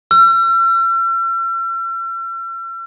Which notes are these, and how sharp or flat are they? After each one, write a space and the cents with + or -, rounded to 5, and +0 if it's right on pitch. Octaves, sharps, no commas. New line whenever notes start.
E6 +45